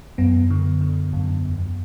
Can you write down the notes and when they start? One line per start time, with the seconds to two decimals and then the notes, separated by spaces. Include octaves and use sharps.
0.18 F#2 B3
0.50 D3
0.81 D3
1.13 F#2
1.45 E2